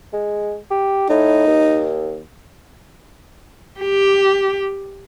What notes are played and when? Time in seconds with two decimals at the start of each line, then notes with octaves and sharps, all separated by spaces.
0.13 G#3
0.70 G4
1.09 A2 D#4
1.47 D#2
3.80 G4